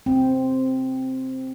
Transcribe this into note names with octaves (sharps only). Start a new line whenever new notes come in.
C4